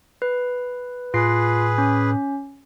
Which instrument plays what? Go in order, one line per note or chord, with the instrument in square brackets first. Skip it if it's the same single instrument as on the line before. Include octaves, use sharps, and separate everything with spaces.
[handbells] B4
[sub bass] A2 [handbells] F4 C7 [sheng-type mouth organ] G#4 B4
[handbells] C#4